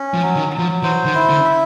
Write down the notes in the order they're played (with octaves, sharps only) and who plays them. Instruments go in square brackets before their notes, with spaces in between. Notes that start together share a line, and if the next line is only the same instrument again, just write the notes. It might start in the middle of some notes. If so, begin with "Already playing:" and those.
Already playing: [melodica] C#4
[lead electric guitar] F3
[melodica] F#3
[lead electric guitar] D#3
[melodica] F#3
[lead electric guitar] F3
[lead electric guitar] E3 [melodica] C5
[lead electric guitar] D#3
[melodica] E4
[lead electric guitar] D3
[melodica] E5